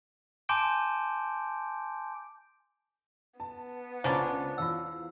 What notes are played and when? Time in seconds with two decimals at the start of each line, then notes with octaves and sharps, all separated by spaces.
0.49 G#5 A5 C6 D6 G6 D7
3.40 B3 A5
4.04 C#2 A#3 C#4 D4 F4 C5
4.58 E2 F4 F5 E6